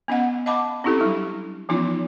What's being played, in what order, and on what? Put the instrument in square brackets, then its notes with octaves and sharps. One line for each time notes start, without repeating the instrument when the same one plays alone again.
[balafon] B3 C#4 D#5 F#5
D#5 F5 F#5 A5 B5 D6
C4 C#4 E4 G4 A4
F#3 G3 D4 E4
E3 F3 B3 C#4 D#4 F4